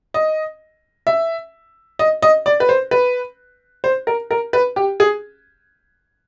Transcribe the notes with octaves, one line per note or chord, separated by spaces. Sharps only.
D#5
E5
D#5
D#5
D5
B4
C5
B4
C5
A#4
A#4
B4
G4
G#4